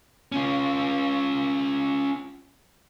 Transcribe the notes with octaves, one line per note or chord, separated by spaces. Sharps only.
C#4 F4